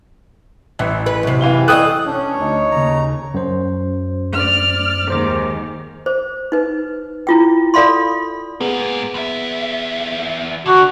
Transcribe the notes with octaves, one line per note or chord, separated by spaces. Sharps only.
A1 E3
B4
F#2 C3
E3 F5 G7
A4 C#5 D#5 G5 D#6 F#6
C#4 D4 C#5
D2 D#4
D#2 C#3 A#5
F#2 C5
D5 F6
D#2 G#2 D#3 C5 D6
C5
D#4 B4
E4 F4 G5
A4 D5 F5 B5 C6
G#2 A#3 B3 G#4
E2 E5
D3 F#4